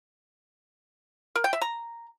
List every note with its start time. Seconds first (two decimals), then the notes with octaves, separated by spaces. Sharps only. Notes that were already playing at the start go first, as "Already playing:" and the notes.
1.36 A#4
1.44 G5
1.53 E5
1.61 A#5